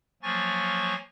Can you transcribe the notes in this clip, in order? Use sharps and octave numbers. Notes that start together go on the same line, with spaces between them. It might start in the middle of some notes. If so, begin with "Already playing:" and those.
F3 F#3 A#3 G#5 C#6 A6